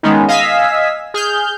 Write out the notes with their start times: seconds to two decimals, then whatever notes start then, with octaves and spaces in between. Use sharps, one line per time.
0.03 D#3 G#3 B3 C#4 D#4
0.28 D#5 F5 G#5 E6 B6
1.14 G#4 F6 G6